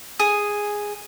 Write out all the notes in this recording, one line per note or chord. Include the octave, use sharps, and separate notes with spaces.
G#4